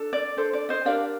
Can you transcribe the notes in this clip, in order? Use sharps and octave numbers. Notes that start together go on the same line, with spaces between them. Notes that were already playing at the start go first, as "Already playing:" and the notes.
Already playing: D4 A4
D5
D4 A4 C5
D5
C5 D#5
D4 G4 A#4 D5 F5